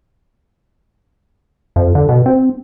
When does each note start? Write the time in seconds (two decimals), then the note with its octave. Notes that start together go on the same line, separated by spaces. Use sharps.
1.76 F2
1.95 D3
2.09 B2
2.26 C4